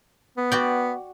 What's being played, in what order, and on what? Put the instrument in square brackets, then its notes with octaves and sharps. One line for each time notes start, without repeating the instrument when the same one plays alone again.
[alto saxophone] B3
[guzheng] F#4 D5 G5